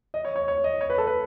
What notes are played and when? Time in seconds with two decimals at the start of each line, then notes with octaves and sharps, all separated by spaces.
0.14 D#5
0.25 C#5
0.36 C#5
0.48 C#5
0.64 D#5
0.81 C#5
0.90 B4
0.98 A4
1.07 B4